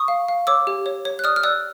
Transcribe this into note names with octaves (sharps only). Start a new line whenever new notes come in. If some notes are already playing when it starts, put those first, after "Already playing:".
Already playing: C#6 D#6
F5
F5
C#5 D6 E6
G4
C#5
C#5
F#6
D5 D#6 F6
F6
D5 E6 F#6